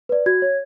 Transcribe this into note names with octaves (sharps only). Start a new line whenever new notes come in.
B4 D5
F#4 G#6
C#5